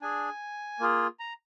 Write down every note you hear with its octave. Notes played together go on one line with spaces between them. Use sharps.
D4 G#4 G#5
A#3 F4 G#4
A#5